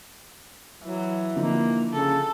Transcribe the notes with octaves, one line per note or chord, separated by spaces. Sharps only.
E3 F#3
D3 F3 A#3 D#4
C#3 A4